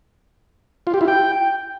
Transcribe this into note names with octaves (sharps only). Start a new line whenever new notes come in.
F4
G4
E4
G5